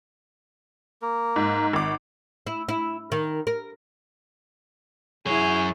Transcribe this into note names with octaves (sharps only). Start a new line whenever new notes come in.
A#3 A#4
G#2
G#1 D6
E4
E4
D#3
A#4
F#2 E4 G#4 C#5